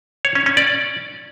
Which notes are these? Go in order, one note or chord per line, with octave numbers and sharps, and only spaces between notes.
C#5
C#4
C#4
D5